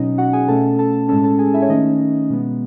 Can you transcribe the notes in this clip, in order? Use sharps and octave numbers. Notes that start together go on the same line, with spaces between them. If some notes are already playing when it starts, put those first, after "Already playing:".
Already playing: B2 F#3 C#4 D#4 D#5
F#4 F#5
G#4 G#5
B2 A3 C#4 A4 A5
A4 A5
A2 G#3 C#4 A4 A5
A4 A5
G#4 G#5
E4 E5
C#5
D#3 A3 C#4 D#4 D#5
B2 G#3 B3